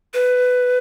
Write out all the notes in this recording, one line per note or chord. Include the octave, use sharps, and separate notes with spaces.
B4